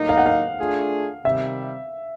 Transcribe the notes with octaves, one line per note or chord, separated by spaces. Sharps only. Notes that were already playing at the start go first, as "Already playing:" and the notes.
Already playing: A2 F#3 A#3 D#4
F5
F#5
F5
A3 D4 F4 G#4
C3 D#3 G3 E5